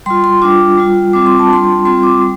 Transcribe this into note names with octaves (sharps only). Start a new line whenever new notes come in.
G3 F4 C6
C6
G3 D4 F4 D6
G3 F4
G3 C4 F4 D6
C6
A5
G3 D4 F4 C6
G3 C4 F4 C6
D6
G3